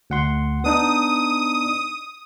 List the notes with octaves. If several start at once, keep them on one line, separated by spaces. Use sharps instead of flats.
D2 F#5 C6
B3 D4 D#4 D#6